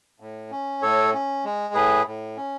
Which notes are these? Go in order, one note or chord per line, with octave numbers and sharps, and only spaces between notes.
A2
C#4
A2 A4 C#5
C#4
G#3
A2 G#4 B4
A2
C#4